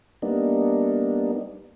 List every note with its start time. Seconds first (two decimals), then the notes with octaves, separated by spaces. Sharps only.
0.22 G3 A#3 B3 D4 D#4